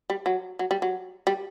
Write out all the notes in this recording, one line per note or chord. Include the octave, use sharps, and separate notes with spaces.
G3
F#3
F#3
G3
F#3
G3